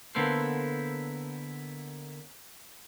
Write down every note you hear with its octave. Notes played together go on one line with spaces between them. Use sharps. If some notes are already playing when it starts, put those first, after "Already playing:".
D3 A#3 B3 E4 A4 C5